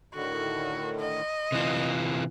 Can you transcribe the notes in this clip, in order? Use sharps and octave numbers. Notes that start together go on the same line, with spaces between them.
A2 D3 D#3 F#4
D#5
C3 E3 F4 F#6